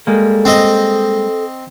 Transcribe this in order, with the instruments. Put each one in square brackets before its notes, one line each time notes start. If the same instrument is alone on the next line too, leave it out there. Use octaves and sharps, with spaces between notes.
[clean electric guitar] G3 G#3 A#3 [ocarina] A4
[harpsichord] C4 D#5